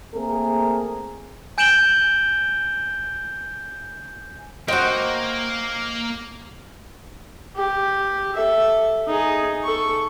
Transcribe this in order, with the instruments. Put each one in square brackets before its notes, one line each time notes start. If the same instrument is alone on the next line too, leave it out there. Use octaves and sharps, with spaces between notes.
[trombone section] A3 A#3 C4 G#4 A#4
[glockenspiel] G#5 G6 D7 E7 F#7 G7
[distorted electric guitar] A#3 [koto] F#4 G5 [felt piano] C5 D#5
[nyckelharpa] G4
A4 E5
D#4 G#4
A4 C#6